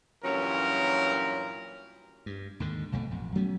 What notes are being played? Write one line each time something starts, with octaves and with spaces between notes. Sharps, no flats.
G2 A#2 E3 F#3 C#4 A#4
G2
D#2 G#2 D3
B1 F2 B2 A3
A1 F2
F#3 A3 B3 C#4